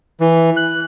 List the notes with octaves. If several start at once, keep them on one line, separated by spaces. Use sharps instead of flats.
E3
F#6